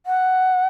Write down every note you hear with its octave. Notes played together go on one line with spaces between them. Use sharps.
F#5